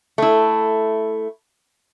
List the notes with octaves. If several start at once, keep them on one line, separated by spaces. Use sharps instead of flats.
A3 E4